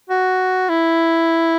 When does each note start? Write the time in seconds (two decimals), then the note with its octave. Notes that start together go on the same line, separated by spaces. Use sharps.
0.10 F#4
0.69 E4